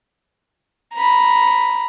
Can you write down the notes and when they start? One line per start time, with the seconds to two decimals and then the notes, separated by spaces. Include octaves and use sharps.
0.94 A#5 B5